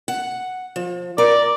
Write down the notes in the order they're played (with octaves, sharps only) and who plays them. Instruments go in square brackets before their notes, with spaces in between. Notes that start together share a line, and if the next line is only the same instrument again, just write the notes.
[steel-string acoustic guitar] F#5
F3
[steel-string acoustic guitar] A#4 [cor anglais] D5